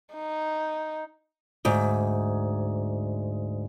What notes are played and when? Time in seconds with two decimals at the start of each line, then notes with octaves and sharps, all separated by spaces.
0.14 D#4
1.65 D2 G#2